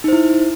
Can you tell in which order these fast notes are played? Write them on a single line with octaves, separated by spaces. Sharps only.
D#4 C5 E4